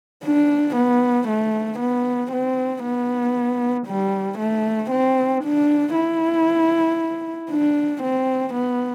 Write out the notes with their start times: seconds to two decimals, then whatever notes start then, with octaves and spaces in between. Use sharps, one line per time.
0.25 D4
0.77 B3
1.28 A3
1.79 B3
2.32 C4
2.83 B3
3.87 G3
4.39 A3
4.91 C4
5.44 D4
5.95 E4
7.51 D4
8.03 C4
8.54 B3